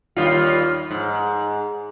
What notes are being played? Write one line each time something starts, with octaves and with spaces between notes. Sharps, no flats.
D#2 G3 F4
G#2